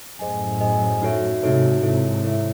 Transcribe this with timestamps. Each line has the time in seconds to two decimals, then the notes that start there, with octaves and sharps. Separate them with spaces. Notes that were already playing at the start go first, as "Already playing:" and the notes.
0.19 F#2 A2 G#4 C5 D#5 G#5
0.61 G#4 C5 D#5 G#5
1.02 D#4 F#4 A4 C#5 E5
1.42 G#2 C3 D#4 F#4 A4 C#5 E5
1.83 G#2 C3 E4 A4 C#5 E5
2.23 E4 A4 C#5 E5